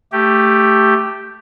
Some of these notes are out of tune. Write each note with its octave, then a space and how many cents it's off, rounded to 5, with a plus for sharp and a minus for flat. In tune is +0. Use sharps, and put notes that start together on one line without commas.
A3 +5 G4 +0